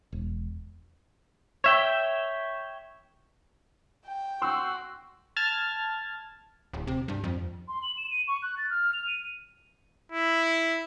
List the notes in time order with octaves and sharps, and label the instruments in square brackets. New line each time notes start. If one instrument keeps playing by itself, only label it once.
[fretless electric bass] E1
[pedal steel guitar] C#5 E5 G5
[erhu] G5
[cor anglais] F#4 [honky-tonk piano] C6 E6
[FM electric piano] A5 F6 G#6 A6
[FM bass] D1
C3
G2
F2
[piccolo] C6
F#7
E7
D#7
C#6
F#6
A6
F6
F7
D#7
[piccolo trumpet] E4